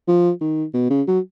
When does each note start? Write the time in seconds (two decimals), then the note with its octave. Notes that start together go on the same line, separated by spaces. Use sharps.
0.08 F3
0.41 D#3
0.74 B2
0.90 C#3
1.08 F#3